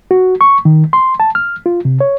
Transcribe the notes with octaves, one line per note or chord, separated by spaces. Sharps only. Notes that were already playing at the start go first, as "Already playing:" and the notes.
F#4
C#6
D#3
C6
A5
F6
F4
C3
C#5